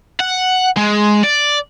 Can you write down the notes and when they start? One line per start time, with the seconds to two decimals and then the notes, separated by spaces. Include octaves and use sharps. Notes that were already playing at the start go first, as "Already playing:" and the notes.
0.20 F#5
0.77 G#3
1.24 D5